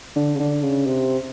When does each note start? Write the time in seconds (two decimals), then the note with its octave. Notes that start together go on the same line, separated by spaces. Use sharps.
0.16 D3
0.35 C#3
0.39 D3
0.63 C#3
0.86 C3